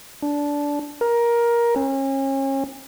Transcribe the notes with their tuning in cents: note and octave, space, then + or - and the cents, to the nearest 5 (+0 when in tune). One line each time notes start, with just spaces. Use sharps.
D4 -15
A#4 +15
C#4 -35